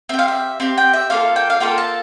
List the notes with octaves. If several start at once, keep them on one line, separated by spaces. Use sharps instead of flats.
C4 G4 E5
F5
E5
C4 G4 F5
G5
E5
A#3 F4 A4 F5
G5
F5
A#3 F4 A4 G5
A5